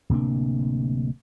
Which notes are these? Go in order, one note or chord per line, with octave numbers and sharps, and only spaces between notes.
D1 C3 A#3 D4